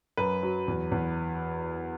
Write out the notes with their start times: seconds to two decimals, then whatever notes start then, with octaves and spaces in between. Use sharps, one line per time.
0.17 F#2 B4
0.43 F#3
0.68 E2
0.92 E2